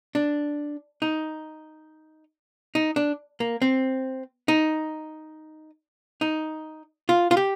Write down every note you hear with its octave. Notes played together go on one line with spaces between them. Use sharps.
D4
D#4
D#4
D4
A#3
C4
D#4
D#4
F4
F4
G4